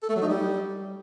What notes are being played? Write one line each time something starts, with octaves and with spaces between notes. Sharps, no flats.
A4
A3
F#3
D#4
G3